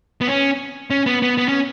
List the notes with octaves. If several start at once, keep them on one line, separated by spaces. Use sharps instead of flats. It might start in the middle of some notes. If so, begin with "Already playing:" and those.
B3
C#4
C#4
B3
B3
B3
C#4